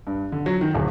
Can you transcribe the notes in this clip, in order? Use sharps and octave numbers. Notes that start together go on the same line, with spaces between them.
G2
D3
F#3
D#3
D1